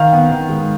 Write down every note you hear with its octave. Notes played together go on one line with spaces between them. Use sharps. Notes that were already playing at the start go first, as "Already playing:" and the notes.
Already playing: D#3 F5
B3
D#3
G#3